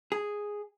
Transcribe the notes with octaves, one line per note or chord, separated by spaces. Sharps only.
G#4